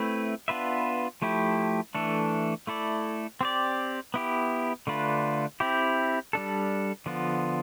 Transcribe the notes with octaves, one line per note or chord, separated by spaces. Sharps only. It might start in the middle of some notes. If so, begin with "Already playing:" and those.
Already playing: A3 C4 E4 B4
B3 D4 F4 B4 E5
F3 A3 E4 G4
E3 A3 D4 A4
A3 E4 A4 D5
C4 G4 D5
B3 E4 G4
D3 A3 D4 F4 B4
C4 E4 G4
G3 D4 A4
D3 F3 B3 F4